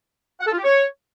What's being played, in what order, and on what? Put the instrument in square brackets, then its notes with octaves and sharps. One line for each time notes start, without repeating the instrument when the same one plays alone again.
[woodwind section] F#5
A4
F4
G4
C#5